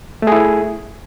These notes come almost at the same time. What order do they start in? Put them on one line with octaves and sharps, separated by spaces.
A3 G#4 E4